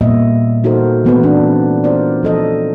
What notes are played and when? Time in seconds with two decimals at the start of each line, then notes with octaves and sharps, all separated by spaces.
0.01 A#2 G3 A#3 B3 D#5 E5
0.64 D#4 F#4 A4 A#4 C5
1.05 E3 A3 B3 C4 F#4 B4
1.23 D4
1.84 F4 A#4 C5 D5
2.23 F3 A4 D#5